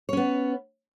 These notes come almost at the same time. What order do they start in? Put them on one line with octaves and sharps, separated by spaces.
C#5 C#4 B3